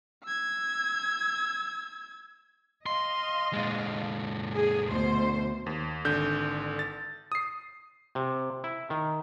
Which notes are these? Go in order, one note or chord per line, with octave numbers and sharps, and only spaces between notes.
E6 G#6
D#5 F5 C6
A#2 G#3
G#4
D2 B2 C5
D#2
G#1 D3 G6
A6
D#6 C7
C3
E4
D#3